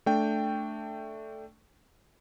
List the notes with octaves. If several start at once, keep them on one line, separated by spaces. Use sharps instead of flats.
A3 D4 G5